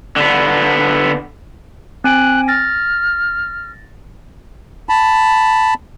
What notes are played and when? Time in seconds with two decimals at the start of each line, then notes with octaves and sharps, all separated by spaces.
0.17 D3 B3
2.04 C4 G#5 F#6 D7
2.48 F6 A6 A#6
4.89 A5 B5